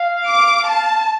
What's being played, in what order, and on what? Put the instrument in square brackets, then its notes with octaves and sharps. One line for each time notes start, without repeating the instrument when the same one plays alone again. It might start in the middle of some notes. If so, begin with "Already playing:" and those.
Already playing: [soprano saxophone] F5
[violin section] D6
A5